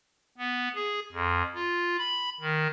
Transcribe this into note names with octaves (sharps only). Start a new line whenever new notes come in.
B3
G#4
F2
F4
B5
D#3